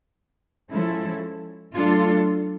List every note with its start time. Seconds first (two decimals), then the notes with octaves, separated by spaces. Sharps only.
0.71 F3 G#3 C#4 E4 A4
1.75 F#3 A3 D4 F4 A4